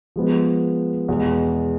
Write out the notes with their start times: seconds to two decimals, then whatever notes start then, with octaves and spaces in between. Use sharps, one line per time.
0.16 F3 G#3 B3
1.08 E2 B2 G#3 B3